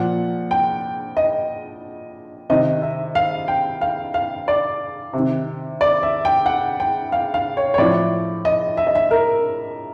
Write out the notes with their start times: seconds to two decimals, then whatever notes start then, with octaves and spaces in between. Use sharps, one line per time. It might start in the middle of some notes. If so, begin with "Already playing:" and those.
Already playing: A#2 F3 F#5
0.51 G5
1.17 D#5
2.50 C3 D#3 D#5
2.82 E5
3.15 F5
3.48 G5
3.81 F5
4.14 F5
4.48 D5
5.13 C3 D#3
5.81 D5
6.03 E5
6.25 G5
6.46 F#5
6.80 G5
7.12 F5
7.34 F5
7.57 C#5
7.74 C#5
7.78 A2 F3 D5
8.45 D#5
8.77 E5
8.87 D#5
8.95 E5
9.11 A#4